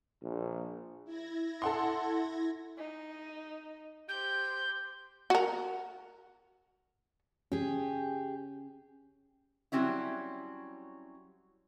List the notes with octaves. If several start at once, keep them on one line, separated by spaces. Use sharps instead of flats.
A#1
E4 G#6 A#6
A4 F#5 C6
D#4
G4 C5 G6
F#4 A#4
C#4 G4 G#4
F#3 G3 C4 C#4 E4